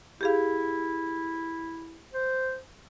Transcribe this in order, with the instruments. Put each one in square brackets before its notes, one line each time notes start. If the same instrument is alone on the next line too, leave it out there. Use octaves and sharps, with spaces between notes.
[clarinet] E4 [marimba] G4 G#4 F5
[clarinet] C5